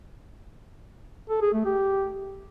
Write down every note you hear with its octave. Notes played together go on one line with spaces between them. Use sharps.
A4
G#4
A3
G4